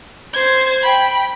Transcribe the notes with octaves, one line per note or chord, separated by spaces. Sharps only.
C5 G#6
G5 B5